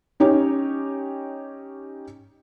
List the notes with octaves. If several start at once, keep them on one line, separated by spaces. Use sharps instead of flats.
C#4 D#4 G4 C#5